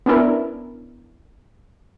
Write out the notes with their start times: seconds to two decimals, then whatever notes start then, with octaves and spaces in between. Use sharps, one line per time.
0.06 B3 C#4 D4 E4 A#4